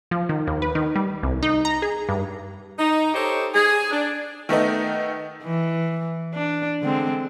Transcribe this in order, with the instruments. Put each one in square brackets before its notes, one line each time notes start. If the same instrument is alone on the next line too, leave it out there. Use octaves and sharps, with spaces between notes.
[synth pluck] F3
D#3
D#2
B4
D#3
G3
C2
D#4
A#5
G#4
G2
[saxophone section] D#4
D#4 G4 A4 C5 C#5
G#4
D4
[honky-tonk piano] D#3 A3 B3 D#4
[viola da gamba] E3
D4
D3 G#3 C4